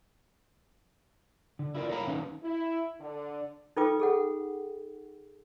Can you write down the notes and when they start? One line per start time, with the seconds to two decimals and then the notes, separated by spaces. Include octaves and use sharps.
1.59 D3
1.75 E4 F4 A#4 D5
1.90 A#4 C#5 E5 F5 A#5 B5
2.07 D#3 C#4 D#4 B4 F5
2.43 E4
3.00 D3
3.77 D#4 F4 A4 B4 G5 D6
4.00 G#4 A4 F#5